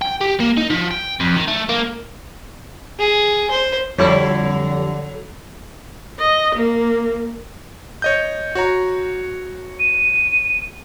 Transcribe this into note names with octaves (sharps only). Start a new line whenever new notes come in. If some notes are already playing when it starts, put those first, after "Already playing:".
G5
G4
A#3
D#4
F3
G5
F2
D#3
A3
A#3
G#4
C5
F2 D3 F#3 G3 E4 A4 C#5
D#5
A#3
C#5 D#5 G6
F#4 C#5 A#5
D#7